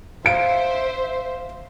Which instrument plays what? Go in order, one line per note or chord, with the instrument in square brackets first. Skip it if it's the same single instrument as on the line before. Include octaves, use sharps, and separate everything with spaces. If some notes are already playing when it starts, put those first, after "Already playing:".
[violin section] C5 E5 [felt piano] F5 D7